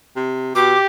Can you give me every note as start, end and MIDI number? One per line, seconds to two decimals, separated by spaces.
0.16 0.51 48
0.55 0.75 47
0.55 0.86 67
0.55 0.79 86